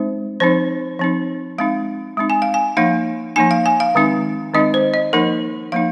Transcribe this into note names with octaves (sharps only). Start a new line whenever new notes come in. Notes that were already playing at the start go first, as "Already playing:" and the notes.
Already playing: G#3 C4 D#4 C5
F3 C4 D#4 C5
F3 C4 D#4
G#3 C4 D#4 F5
G#3 C4 D#4
G#5
F5
G#5
F3 A#3 D#4 F5
F3 A#3 D#4 G#5
F5
G#5
F5
D#3 G#3 C4 D#4
D#3 G#3 C4 D#4 D#5
C5
D#5
F3 A#3 D#4 A#4
F3 A#3 D#4 F5